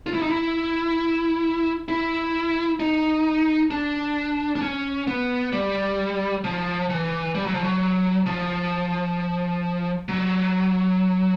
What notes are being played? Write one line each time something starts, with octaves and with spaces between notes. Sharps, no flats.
F4
E4
D#4
E4
E4
D#4
D4
D4
C#4
B3
G3
F3
E3
G3
F#3
F3
F#3
F3
F#3